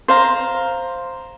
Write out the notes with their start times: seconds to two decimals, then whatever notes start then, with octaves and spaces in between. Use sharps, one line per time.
0.08 C5 F5 A#5